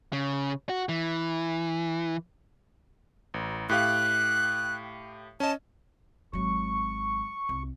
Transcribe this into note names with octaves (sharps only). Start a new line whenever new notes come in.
C#3
F#4
E3
A1
A2 G4 F5 F#6
C#4 D#5 A5
G#1 F#3 C#6
C2